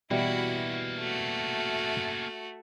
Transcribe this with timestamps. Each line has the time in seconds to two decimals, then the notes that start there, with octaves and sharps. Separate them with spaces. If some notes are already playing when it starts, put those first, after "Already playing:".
0.11 B2 E3 G3 A#3 C#4 E4 F#4
0.98 A3 F#4